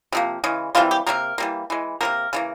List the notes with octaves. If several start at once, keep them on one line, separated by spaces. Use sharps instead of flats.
C3 F3 A#3
C#3 E3 G#3
C3 E3 G3 A#3 F4
G4
C3 G3 A#3 A#4
E3 G3 A#3
E3 G#3
C3 F3 A#3 A#4
C#3 E3 A#3